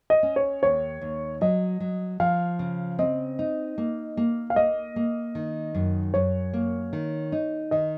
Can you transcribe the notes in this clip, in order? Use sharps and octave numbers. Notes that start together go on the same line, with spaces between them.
D#5
C#4
C#5
D#2 C#5
D#2
F#3 D#5
F#3
F3 F5
C#3
C4 D#5
D#4
A#3
A#3
F5
A#3 D#5
A#3
D#3
F#2
F#2 C#5
A#3
D#3
D#4
D#3 D#5